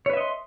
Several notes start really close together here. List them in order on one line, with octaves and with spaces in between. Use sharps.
C#5 B4 E5 D#5 C6